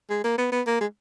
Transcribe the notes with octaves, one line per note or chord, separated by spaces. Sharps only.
G#3
A#3
B3
B3
A#3
G#3